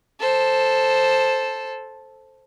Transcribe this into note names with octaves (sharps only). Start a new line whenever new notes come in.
A4 C5